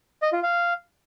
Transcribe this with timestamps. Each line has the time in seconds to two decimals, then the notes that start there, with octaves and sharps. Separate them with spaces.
0.22 D#5
0.33 F4
0.43 F5